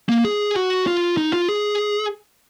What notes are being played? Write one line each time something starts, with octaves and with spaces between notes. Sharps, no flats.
A#3
G#4
F#4
F4
D#4
F4
G#4